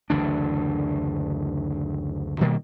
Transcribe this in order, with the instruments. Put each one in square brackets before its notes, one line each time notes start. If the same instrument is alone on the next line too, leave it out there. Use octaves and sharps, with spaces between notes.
[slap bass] F#1 D2 E3 D4
B2 D#3 G3 A#3